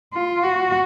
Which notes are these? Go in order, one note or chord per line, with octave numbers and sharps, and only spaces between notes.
F4
F#4